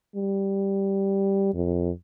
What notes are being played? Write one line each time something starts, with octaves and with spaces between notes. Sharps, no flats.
G3
F2